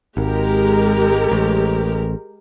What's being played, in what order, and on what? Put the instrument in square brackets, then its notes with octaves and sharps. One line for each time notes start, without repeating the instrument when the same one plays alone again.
[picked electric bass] G#1 [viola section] G#3 G4 A#4
[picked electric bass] A1